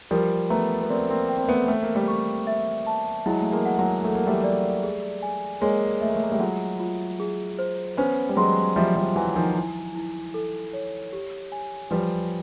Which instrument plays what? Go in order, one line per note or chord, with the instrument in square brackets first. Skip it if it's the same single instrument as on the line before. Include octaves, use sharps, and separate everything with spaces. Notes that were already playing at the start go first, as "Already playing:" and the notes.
[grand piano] F3 G3 [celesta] A#4
[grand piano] A3 B3 [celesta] A#5
[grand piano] B3
[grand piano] A#3 C4 [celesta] D5
[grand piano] A#3 C4
[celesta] G5
[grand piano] C4
A3 B3
[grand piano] A3 [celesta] C5
[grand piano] A#3
G3 A3
[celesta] C#6
E5
A5
[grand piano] F#3 G#3 [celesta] E4
[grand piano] A3
G#3 A#3
[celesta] F#5
[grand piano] F#3 G#3
[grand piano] A3 [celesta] A4
[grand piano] A#3
G3 A3
[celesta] D5
G#4
G#5
[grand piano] G#3 A#3 [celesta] C#5
[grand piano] A3 [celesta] E5
[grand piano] A#3
A3
A#3
G3 A3
[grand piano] F#3 G#3 [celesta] F4
[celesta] F4
G#4
C5
[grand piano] B3 C#4 [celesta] C5
[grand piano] G3
[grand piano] F#3 G#3 [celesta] C6
[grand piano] F3 G3 [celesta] E5
[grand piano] F3 G3
[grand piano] E3 F#3 [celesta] G#5
[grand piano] D#3 F3
[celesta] E4
E4
A4
C#5
G4
G#5
[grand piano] F3 G3 [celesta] B4